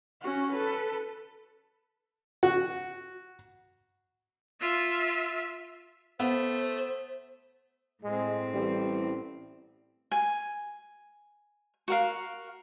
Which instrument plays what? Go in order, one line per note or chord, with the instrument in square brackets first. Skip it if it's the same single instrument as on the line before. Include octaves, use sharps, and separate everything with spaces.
[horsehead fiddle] C#4 F#4
A4 B4
[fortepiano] F#4
[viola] F4 E5
[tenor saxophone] A3 [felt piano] B3 [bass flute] C5
[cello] A2 C4 [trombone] G#3
[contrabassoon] A1 [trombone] G3
[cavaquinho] G#5
F#4 A#4 F5